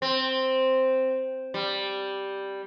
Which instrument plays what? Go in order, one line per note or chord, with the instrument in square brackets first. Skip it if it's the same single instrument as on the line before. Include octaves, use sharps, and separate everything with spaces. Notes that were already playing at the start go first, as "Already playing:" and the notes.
[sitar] C4
G3